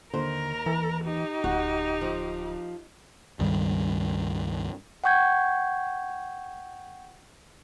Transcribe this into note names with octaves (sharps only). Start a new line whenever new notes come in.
D#2 D3 A#4 C5 A#5
E3
D#4 G4
D1 F#4
F3
C#2 G2 D#3 G3
F#5 G5 C#6 G6 G#6